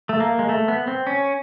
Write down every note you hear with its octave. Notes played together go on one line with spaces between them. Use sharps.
A3
A#3
G#3
A3
B3
C4
C#4